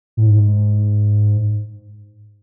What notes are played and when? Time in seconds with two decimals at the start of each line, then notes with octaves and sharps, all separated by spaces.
0.17 A2
0.27 G#2